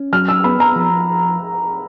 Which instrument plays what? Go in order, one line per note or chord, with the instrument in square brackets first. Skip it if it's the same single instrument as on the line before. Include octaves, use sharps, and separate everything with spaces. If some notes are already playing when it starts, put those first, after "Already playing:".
Already playing: [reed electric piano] C#4
[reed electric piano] F#3 [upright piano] F6
[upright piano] E6
[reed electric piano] B3 [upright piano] B5
[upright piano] A#5
[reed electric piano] F3